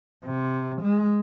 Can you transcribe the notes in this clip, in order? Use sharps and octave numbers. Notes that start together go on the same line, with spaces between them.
C3
G#3